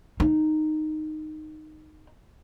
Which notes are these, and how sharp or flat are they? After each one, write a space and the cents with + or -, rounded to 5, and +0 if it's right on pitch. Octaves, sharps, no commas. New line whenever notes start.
D#4 -10